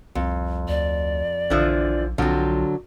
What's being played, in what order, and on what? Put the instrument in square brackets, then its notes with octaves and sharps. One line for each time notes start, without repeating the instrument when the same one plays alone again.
[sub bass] C2 [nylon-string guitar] F2
[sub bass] D2 [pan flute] D5
[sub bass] A#1 [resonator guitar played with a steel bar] D3 E3 F3
[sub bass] B1 [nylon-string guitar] D3 F#3 [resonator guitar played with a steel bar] F3 C4